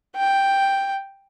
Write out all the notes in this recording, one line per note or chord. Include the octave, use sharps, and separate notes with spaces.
G5